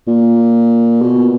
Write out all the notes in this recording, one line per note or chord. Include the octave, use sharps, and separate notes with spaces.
A#2
B2